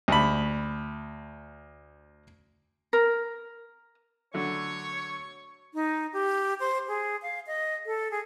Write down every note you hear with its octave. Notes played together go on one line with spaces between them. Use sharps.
D2 B5
A#4
D3 F#3 A3 C#5 C#6
D#4
G4
C5
G#4
F5
D#5
A4
G#4